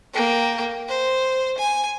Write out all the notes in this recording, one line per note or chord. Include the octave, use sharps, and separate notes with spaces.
A#3 G5
C5
G#5